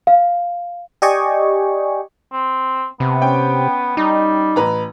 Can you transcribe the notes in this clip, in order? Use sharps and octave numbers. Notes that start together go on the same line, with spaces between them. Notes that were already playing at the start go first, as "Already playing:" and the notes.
F5
G4 D5 D#5 G5 G#5 C#6
C4
C3 B3
C#4 G5
G3 D#4
A1 B4 A#5